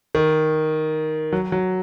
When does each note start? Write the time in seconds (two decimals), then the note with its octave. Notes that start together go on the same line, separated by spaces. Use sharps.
0.15 D#3
1.32 F#3
1.52 F#3